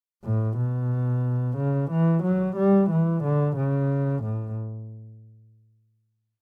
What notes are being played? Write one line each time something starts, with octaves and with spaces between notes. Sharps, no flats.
A2
B2
C#3
E3
F#3
G3
E3
D3
C#3
A2